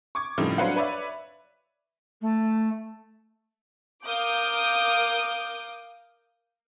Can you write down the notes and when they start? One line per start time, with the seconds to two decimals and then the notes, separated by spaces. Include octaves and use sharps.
0.15 C#6 D6 G#6
0.38 A2 C#3 F3 G3 A3 D#4
0.58 F#3 D4 B4 C5 F5 F#5
0.76 B4 C#5 D5 E5
2.21 A3
4.04 A#4 F5 D6 D#6 G6